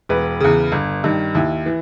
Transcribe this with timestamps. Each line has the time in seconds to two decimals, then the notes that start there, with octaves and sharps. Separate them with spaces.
0.09 E1 B4
0.40 E2 C#3
0.72 G1
1.04 G2 D#3
1.35 D#2 E4
1.66 E3